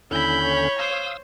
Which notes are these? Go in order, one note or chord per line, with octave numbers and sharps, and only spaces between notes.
D#2 D3 C#4 E4 B5 G6
C#5
C5 F5 D#6 E6